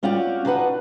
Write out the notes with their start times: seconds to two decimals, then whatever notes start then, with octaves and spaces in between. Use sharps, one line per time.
0.03 C4 C#4 F4 F#4 D5 G5
0.45 D4 D#4 F#4 B4 F#5